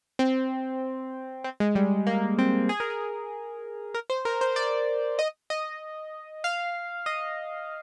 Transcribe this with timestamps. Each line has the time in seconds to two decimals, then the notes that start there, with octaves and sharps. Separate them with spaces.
0.19 C4
1.44 C4
1.60 G#3
1.75 G3
2.07 A#3
2.39 C4
2.69 G#4
2.80 A#4
2.90 G#4
3.94 A#4
4.10 C5
4.25 A#4
4.41 C5
4.56 D5
5.19 D#5
5.50 D#5
6.44 F5
7.06 D#5